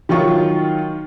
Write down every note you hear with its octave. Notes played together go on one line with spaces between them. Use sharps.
D#3 F#3 F4 C#6